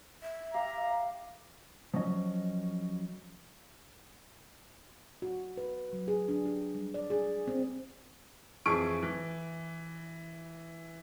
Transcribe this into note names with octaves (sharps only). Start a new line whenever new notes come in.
E5
G4 F5 A#5
F3 F#3 C#4 D#5
F#4
B4
F#3
G#4
D4
G4
G3
D5
G#4
C4
F2 E3 G#4 C#6 D7
E3